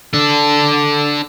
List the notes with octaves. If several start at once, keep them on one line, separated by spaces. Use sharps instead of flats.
D4 A4